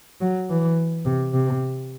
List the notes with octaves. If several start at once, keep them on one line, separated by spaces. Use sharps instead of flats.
F#3
E3
C3
C3